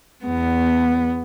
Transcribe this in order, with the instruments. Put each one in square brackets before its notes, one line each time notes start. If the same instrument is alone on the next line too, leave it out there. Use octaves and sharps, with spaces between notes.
[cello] E2 B3